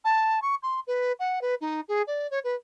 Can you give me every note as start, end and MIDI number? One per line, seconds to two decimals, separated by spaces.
0.04 0.39 81
0.42 0.55 85
0.63 0.80 84
0.87 1.12 71
1.19 1.39 78
1.41 1.55 71
1.61 1.81 63
1.88 2.02 68
2.07 2.27 74
2.31 2.39 73
2.44 2.55 71